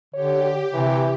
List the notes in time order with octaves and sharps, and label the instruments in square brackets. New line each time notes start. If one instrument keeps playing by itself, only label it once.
[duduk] D3 [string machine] G4 [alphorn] C#5
[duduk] C3 [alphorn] E3